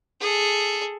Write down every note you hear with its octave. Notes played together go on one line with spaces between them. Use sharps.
G#4 A4